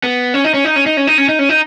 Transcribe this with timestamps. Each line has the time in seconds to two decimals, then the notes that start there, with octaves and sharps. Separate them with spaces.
0.04 B3
0.34 C#4
0.44 D#4
0.54 C#4
0.64 D#4
0.76 C#4
0.86 D#4
0.97 C#4
1.07 D#4
1.18 C#4
1.29 D#4
1.39 C#4
1.49 D#4